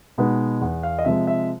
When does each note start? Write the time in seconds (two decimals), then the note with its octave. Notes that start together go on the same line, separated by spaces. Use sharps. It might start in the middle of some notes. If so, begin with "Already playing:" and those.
0.18 B2 G#3 B3 D#4
0.61 E2 F#5
0.83 F5
0.99 D#5
1.05 C3 F3 G#3 E5
1.27 E5